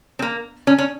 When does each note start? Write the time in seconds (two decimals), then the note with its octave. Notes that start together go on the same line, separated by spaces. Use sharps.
0.19 C4
0.22 A#3
0.67 C#4
0.78 C#4